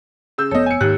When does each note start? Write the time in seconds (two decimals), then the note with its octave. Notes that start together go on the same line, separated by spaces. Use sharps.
0.38 C#3 E6 G6
0.51 F1 B3 A4 C#5 D#5
0.66 G#5 C#7
0.81 D#2 G#2 G4 F#6